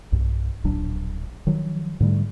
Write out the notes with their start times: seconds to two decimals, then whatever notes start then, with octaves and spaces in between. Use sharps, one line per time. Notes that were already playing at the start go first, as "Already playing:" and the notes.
0.12 B1 G2
0.64 D1 A#1 F#3 D4
1.47 D#3 F3 F#3
2.00 G#2 D3 G3 A3